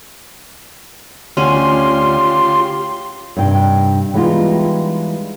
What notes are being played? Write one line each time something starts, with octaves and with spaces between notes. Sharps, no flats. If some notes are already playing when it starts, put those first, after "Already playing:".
D2 C#4 F4 G4 C6
G2 C3 D#4 G5
E3 G3 G#3 B3 D#4 F4